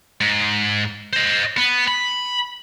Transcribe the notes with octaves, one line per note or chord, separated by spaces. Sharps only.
G#2
C5 D#5
B3
B5